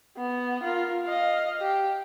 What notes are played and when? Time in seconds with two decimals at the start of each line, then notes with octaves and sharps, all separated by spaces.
0.17 B3
0.63 F4 A#4
1.06 D#5 F5
1.61 G4